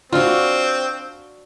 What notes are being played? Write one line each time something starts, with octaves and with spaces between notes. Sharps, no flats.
C4 D4 F4 F#4